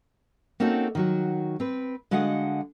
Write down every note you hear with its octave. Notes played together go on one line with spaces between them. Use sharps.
A#3 C4 C#4 D#4 F#4 A4
D#3 F#3 F#4
C4 B4
D3 G#3 F#4 D#5 F5 F#5